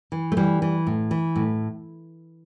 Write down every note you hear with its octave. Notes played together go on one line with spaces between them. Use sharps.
E3
A3
E3 G3
E3
A2
E3
A2